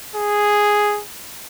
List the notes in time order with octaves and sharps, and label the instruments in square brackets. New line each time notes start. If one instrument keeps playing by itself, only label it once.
[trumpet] G#4